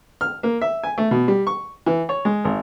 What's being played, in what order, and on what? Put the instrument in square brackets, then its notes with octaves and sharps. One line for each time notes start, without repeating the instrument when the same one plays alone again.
[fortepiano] F6
A#3
E5
G#5
A3
B2
G3
C#6
E3
C#5
G#3
G#1